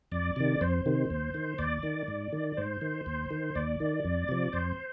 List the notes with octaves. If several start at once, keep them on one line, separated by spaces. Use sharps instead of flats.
F2 D5
C3 D#3
F2 C5
C3 D#3
D#2
D#3
D#2 D5
D#3
G#2
D#3
G#2 C5
D#3
D#2
D#3
D#2 D5
D#3
F2
C3 F3
F2 C5